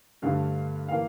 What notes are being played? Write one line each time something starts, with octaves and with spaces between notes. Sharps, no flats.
G2 D3 A3 F5
E3 A#3 F5